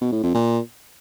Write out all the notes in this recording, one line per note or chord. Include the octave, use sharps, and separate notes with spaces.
B2
A2
F2
A#2